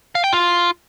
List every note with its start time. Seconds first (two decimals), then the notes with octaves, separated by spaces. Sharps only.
0.15 F5
0.24 G5
0.33 F4